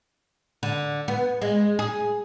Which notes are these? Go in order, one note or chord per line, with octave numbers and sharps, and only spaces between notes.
D3
B3
G#3
G#4